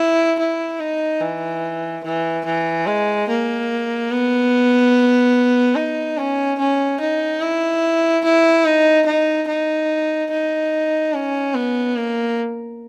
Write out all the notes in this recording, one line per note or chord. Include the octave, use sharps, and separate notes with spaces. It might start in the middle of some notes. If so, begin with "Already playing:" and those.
Already playing: E4
E4
D#4
E3
E3
E3
G#3
A#3
B3
D#4
C#4
C#4
D#4
E4
E4
D#4
D#4
D#4
D#4
C#4
B3
A#3